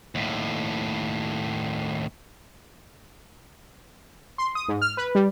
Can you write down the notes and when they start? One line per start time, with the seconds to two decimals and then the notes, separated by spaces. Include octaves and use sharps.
0.15 D#2 A2
4.38 C6
4.55 D#6
4.68 G#2
4.82 F6
4.97 B4
5.15 G3